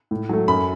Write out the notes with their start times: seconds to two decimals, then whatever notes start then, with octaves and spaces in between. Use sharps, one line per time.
0.11 A2
0.29 F#3 A3
0.48 F#2 B5